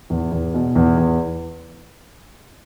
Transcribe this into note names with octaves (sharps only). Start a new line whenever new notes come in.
E2
E2
B2
E2
E2